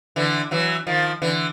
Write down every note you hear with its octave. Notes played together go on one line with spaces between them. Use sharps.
D3 E3
E3 F#3
D#3 F3
D3 E3